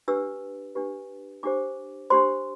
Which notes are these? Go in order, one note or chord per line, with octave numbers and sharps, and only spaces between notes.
D4 G4 B4 E6
D4 G4 B4
D4 G4 C5 D6
D4 G4 C5 C6